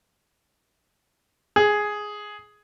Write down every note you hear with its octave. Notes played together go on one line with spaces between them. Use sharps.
G#4